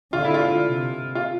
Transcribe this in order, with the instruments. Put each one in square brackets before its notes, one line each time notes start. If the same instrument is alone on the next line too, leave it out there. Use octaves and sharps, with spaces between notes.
[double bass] D3 [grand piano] F4
[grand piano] E4
F4
[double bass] C3
[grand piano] F4